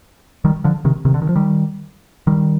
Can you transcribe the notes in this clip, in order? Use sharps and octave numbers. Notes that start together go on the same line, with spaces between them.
D#3 G3
D3 F3
C3 D#3
C3 D#3
D3
D#3
F3
D#3 G3
D#3 G3